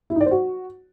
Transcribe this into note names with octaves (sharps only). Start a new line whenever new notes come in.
E4
D#4
D5
C5
F#4